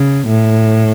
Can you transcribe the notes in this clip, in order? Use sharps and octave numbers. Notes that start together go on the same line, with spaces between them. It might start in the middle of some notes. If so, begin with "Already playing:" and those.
Already playing: C#3
A2